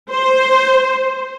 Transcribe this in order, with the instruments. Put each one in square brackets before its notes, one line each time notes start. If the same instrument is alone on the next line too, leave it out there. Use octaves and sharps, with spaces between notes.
[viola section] C5